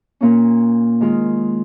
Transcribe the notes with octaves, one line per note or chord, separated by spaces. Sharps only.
A#2 A#3 C#4
D#3 G#3 F4